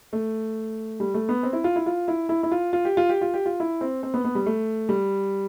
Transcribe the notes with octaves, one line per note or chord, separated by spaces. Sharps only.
A3
G3
A3
B3
C4
E4
F4
E4
F4
E4
E4
E4
F4
F4
G4
F4
G4
F4
G4
F4
E4
C4
C4
B3
B3
G3
A3
G3